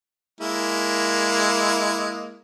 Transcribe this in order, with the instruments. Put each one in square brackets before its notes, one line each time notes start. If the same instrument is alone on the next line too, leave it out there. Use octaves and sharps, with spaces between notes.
[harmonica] G#3 A#3 E4